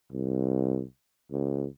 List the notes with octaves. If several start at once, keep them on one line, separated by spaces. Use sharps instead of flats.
C2
C#2